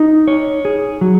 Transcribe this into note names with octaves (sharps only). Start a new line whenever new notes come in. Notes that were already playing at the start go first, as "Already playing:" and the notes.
Already playing: D#4
C#5
G#4
F#3